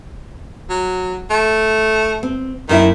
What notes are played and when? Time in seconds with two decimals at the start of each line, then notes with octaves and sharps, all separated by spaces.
0.70 F#3
1.30 A3
2.23 C4
2.69 F#2 D#3 A#3 E4